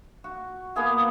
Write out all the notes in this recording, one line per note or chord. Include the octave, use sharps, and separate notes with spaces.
F#4
A#3 B3 G#4 F5